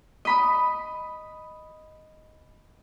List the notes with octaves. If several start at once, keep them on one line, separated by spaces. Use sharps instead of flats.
D#5 B5 D#6